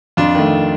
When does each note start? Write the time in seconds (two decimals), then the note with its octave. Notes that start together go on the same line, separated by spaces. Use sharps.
0.17 F2 D4 F4
0.35 D#3 A3